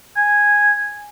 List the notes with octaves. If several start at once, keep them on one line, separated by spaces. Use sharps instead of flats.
G#5